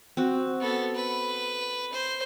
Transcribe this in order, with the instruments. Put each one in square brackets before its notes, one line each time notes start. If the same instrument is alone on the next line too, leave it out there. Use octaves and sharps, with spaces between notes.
[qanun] C4 F#4
[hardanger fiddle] B3 A4
B4
C5